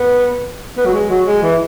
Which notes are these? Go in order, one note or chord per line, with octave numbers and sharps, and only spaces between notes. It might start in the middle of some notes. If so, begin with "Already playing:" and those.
Already playing: B3
B3
F#3
G#3
F#3
G#3
E3